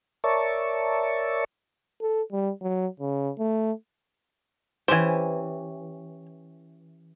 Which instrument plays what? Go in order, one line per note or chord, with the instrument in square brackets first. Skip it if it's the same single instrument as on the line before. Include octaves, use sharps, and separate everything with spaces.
[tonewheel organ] A#4 C#5 D5 E5 A5 C#6
[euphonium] A4
G3
F#3
C#3
A3
[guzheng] E3 C#4 G4 [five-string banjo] C5 G#5